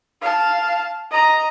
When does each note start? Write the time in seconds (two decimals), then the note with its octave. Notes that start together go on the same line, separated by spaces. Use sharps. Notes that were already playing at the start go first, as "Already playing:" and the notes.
0.21 F5 A5
1.10 D#5 A#5